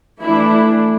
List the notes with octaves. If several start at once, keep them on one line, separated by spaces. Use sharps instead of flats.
E3 A3 D4 E4